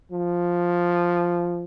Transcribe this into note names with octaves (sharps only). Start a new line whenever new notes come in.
F3